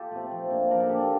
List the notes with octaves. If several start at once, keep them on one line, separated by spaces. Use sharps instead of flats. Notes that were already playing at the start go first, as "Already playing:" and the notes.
Already playing: F4 G4 A4
A3 C4
F3
A#3 D4
F3 A#4
A4
A#3 D4 G4
A4